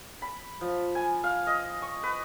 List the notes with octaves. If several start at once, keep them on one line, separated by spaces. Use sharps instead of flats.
B5
F3
G#5
F5
D#5
C#6
B4